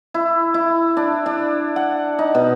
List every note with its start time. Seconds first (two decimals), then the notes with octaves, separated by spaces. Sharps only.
0.14 E4
0.54 E4
0.97 D4
1.26 D4
1.76 F#5
2.19 D#4
2.35 B2